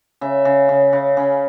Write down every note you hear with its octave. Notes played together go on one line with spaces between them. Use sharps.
C#3 E5
C#3
C#3
C#3
C#3